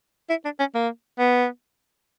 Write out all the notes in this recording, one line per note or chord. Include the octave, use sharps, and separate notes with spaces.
E4
D4
C#4
A#3
B3